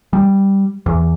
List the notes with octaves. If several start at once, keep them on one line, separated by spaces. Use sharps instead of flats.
G3
E2